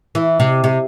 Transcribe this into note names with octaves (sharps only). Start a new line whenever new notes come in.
E3
C3
C3